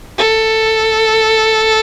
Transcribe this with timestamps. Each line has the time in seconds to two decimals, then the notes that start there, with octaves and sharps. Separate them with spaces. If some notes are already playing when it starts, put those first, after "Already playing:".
0.18 A4